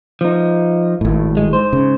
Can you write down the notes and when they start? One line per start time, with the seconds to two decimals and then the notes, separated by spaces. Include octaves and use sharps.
0.21 F3 D#4
1.01 G#1 A2
1.37 G#3
1.53 G#2 C5
1.73 C#3